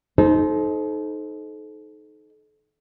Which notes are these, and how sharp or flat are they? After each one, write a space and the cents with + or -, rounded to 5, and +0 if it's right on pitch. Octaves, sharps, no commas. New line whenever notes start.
D#4 +0 A4 -35 C5 +0